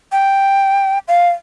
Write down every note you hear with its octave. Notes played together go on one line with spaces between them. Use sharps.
G5
F5